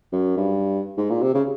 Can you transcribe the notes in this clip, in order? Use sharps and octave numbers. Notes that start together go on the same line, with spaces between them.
F#2
G2
G#2
A#2
C3
C#3